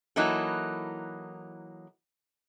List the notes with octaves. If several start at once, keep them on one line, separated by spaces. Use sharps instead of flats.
E3 F#3 A#3 D#4 E4 A4